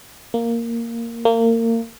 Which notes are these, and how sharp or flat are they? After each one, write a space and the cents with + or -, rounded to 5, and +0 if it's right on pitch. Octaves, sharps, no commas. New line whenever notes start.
A#3 -5
A#3 -30